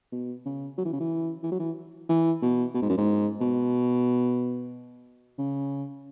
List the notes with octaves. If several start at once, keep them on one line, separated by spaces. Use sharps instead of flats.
B2
C#3
F#3
E3
C#3
E3
E3
F#3
E3
E3
B2
B2
G#2
F#2
G#2
B2
C#3